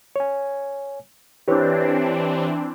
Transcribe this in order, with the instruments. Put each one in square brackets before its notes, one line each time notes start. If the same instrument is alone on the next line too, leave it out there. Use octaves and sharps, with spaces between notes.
[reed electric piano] C#5 G#5
[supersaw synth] E3 C4 D4 [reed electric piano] G4 B4 C#5